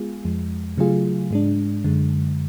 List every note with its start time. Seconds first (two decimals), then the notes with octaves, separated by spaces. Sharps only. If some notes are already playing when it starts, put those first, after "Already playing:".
Already playing: G#3 B3 F4 G#4
0.25 F2 F3 G#3
0.77 C#3 F#3 A3 F4 G#4
1.31 G#2 G#3 D4
1.84 F#2 D3 G#3